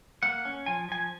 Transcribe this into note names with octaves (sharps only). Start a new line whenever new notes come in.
A#3 F#5
C#4
F3 G#5
F3 G#5